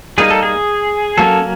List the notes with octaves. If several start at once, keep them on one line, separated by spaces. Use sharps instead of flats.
G3 A#3 D#4 G#4
A4
G#4
F#3 A#3 C#4 A4